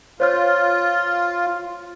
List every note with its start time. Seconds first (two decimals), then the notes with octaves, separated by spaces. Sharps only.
0.20 F4 C5 C#5 F6